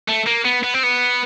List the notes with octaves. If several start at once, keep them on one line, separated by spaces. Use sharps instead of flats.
A3
A#3
B3
B3
C4
B3